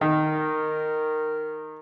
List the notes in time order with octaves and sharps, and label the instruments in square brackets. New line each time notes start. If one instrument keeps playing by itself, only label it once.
[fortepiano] D#3 [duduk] A#4